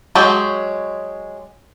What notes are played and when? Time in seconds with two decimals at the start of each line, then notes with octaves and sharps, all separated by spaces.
0.15 F#3 G#3 G4